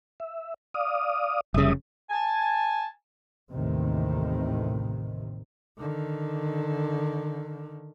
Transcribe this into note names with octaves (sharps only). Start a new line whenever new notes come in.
E5
D5 F5 D#6
F1 C#3 G3 E5 D#6
G#5 A5
A1 D#2 A2 C3 D#3
D3 D#3